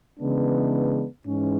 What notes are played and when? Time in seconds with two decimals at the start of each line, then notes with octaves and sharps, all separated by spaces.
0.19 C#3 E3 G#3 B3 D4
1.25 G#2 E3 G#3 C#4